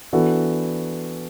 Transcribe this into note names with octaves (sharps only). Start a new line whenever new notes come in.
E3 B3 D4 F#4 A4